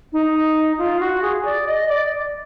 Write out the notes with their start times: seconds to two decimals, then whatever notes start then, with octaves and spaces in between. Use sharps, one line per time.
0.13 D#4
0.78 F4
1.00 F#4
1.22 G#4
1.45 D5
1.67 D#5
1.89 D5